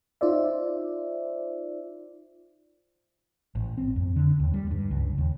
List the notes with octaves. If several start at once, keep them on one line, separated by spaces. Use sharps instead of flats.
D#4 F4 C5 D5 E5
A1
C4
F2
D3
D#2
G3
G2
C#2
D#2